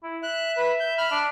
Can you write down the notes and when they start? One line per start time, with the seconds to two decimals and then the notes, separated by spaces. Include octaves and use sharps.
0.03 E4
0.23 E5 F#6
0.57 B4
0.80 G6
0.98 B5 F6
1.11 D4